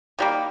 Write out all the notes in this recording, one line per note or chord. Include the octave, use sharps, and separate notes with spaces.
D#3 G3 A#3